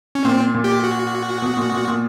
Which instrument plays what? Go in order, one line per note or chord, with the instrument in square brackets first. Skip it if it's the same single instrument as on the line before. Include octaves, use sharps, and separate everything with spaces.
[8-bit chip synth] C#4
[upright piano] A#2 [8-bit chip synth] C4
[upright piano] A#2
[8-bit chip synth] G4
F#4
[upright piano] B2
A#2
A#2
A#2